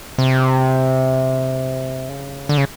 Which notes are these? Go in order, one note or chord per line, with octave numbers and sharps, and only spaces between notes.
C3
C#3
D3
C#3